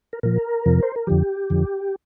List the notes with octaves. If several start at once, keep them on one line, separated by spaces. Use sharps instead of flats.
A#4
A#2 F3 A#4
F2 C3 F3
C5
A#4
F2 D3 F3 G4
F2 D3 F3